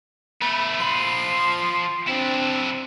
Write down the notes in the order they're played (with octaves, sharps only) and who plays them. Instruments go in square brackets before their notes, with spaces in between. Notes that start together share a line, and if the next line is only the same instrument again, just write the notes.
[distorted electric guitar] A3 B3 [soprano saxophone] B5
[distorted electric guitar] F3 B5 [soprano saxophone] C6
[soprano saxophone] C4 [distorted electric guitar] D4 E4